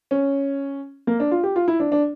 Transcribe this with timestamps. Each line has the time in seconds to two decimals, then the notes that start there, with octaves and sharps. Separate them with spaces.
0.11 C#4
1.07 A#3
1.20 D4
1.31 F4
1.43 G4
1.56 F4
1.68 E4
1.80 D4
1.92 D4